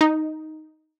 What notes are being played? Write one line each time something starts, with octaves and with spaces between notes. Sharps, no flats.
D#4